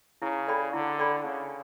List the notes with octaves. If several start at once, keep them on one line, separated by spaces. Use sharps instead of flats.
C#3 E4
A4 D5 G5 B5
D3 E4
A4 D5 G5 B5
C#3 D4